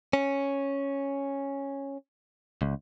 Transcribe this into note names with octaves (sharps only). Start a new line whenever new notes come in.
C#4
C#2